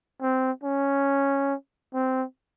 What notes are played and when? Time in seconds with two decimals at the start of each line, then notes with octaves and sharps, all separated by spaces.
0.21 C4
0.63 C#4
1.94 C4